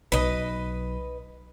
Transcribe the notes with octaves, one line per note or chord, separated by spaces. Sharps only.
B1 B4 D#5